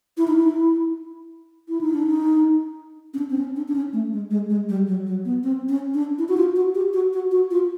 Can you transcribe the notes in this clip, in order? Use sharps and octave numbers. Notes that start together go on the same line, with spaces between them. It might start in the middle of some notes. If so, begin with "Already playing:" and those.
E4
D#4
E4
E4
D#4
D4
D#4
C#4
D4
C4
C#4
D4
D4
C#4
A3
G#3
G#3
G#3
G3
F#3
F#3
B3
C4
C#4
D4
E4
F#4
F4
F#4
G4
F#4
F#4
F#4
F4